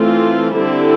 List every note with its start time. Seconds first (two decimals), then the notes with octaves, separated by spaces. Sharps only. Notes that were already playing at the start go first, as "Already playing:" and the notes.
Already playing: E3 A3 C4 F4 A4
0.56 D3 G3 C4 E4 A4